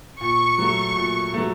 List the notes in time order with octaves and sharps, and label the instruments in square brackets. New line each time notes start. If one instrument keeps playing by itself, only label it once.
[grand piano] A#2 [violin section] C#6
[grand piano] F#3 A3
A#2
F#3 A3